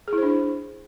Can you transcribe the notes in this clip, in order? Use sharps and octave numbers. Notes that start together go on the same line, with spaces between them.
G#4
E4
C5
D4